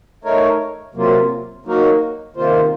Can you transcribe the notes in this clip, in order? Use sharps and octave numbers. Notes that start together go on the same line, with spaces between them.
A3 D#4 A#4 C#5
C3 F#3 A#3 F4
F#3 A#3 D#4 F#4 A#4
C3 D#3 A#3 F4 C5